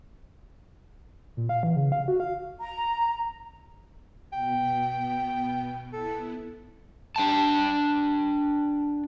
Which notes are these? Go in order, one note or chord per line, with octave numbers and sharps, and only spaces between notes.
A#2
F5
E3
C#3
F5
F#4
F5
A#5
B2 B3 G5
B3 E4 A4
D4 G5 A5